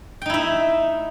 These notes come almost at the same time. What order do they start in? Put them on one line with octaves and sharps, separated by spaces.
G5 D#4 E4 E5